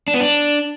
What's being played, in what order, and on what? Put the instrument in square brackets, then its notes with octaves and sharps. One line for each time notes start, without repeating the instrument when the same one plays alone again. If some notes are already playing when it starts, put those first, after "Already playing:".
[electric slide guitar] D4
B3
D4